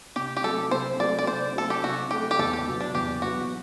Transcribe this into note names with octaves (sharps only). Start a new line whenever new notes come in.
C3 G4
G4
F#3 A3 A4
C3 C5
F#3 A3 D5
D5
C3 C5
F#3 A3 A4
G4
C3 F#4
F#3 A3 G4
G4
E2 A4
G4
B2 F#3 B3
D4
E2 G4
B2 F#3 B3 F#4